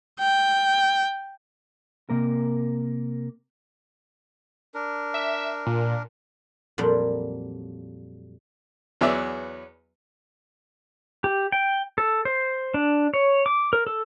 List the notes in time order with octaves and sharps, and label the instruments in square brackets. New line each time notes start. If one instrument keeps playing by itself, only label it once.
[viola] G5
[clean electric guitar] C3 A#3 A#4
[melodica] D4 A#4
[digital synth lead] E5
A#2
[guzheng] F2 A#2 F#3 G3
[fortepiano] E2 F#3 B3 G#4 D5 E5
[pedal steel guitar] G4
G5
A4
C5
D4
C#5
D6
A#4
A4